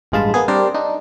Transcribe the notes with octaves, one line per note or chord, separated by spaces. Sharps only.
A1 G2 G#3 F4 A5 B5
A#3 B3 G#4
G3 C4 D4 A#4 C5 D5
D4 D#4